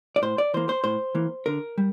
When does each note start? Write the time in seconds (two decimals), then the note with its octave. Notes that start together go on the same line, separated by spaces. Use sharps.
0.16 D5
0.22 A2 C5
0.38 D5
0.54 E3 A#3 C5
0.69 C5
0.84 A2 C5
1.15 E3 A#3
1.46 D3 A#4
1.78 G3